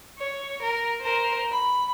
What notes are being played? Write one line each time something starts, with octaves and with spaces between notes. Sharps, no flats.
C#5
A#4
A#4 C5
B5